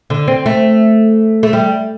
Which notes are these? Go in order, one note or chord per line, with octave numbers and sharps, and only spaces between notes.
D3
C4
A3
A3
G3